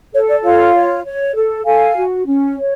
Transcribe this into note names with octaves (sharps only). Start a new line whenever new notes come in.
A4 C#5
D5
F4 C#5 F5
C#5
C#5
A4
A4 F5 G#5
F#4
C#4
C#5